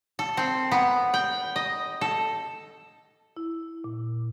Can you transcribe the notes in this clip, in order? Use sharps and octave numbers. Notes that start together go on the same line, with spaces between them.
A4
C4
B3
G5
D#5
A4
E4
A#2